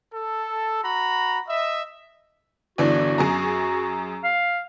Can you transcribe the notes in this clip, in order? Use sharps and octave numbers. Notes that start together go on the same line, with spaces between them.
A4
F#4 A#5 B5
D#5 E5
G1 E3 D4 F#4
F#2 G#4 A#5
F5